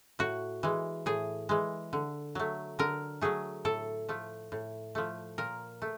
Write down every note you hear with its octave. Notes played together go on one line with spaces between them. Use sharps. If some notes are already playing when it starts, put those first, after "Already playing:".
A2 F#4
E3 G#3
A2 G#4
E3 G#3
D3
F#3 A3
D3 A#4
F#3 A3 G#4
A2 A4
F3 A3
A2
F3 A3
A#2 A#4
A3